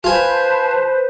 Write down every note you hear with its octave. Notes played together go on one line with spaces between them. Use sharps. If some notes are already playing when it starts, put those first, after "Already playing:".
F4 B4 C5 G#5 A5